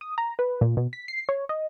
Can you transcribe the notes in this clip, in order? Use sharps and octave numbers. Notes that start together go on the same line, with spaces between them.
D#6
A#5
B4
A#2
B2
B6
C7
C#5
D#5